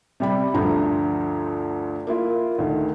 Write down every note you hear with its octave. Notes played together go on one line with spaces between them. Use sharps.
C3 G3 B5
D2 G2 F3 A#5
A#3 E4 F4
D2 D#3